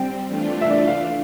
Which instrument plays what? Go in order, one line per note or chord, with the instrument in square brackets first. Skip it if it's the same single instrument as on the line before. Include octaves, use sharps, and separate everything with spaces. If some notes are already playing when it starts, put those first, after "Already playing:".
Already playing: [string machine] G3 C4 [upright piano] G5
[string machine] E3 A3 D4 F4
[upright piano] E5
D5
E5
F5